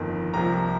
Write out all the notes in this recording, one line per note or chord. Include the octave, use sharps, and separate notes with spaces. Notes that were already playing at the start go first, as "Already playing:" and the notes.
Already playing: G1 F2 D#3 A#3
C2 C3 F3 A#3 A#5